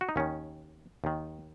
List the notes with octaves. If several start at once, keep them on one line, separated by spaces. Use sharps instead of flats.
F#4
D#4
D#2 D#3 C#4
D#2 D#3